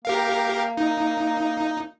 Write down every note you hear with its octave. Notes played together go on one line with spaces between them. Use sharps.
A#3 G4 A#4 F5
D#4